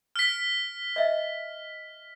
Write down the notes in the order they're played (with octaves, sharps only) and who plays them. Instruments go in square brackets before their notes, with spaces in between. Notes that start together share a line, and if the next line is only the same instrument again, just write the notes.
[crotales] F6 B6
[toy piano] D#5 E5